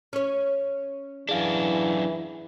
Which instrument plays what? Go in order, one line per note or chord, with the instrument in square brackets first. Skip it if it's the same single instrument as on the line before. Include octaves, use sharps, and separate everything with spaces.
[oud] C#4 C#5
[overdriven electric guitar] F#2 D4 [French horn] E3 [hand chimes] G#4 F5